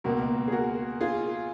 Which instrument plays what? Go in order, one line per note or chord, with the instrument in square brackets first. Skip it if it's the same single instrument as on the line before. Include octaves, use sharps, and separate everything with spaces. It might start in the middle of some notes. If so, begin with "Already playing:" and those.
[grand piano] C#2 B2 A#3 [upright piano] F#4 A#4
[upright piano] G#4
F#4 A#4
F4 G#4